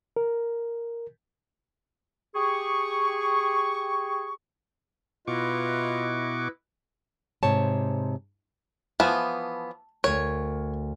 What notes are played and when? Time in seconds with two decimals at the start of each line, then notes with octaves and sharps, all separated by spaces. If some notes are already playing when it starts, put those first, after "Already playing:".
0.17 A#4
2.35 G4 G#4 C#6
5.28 B2 E4 F4 B4 D#5 C#6 D6
7.43 G#2 C3 C#5 A5
9.00 E3 F3 B3 A5
10.04 D2 A#4 C#5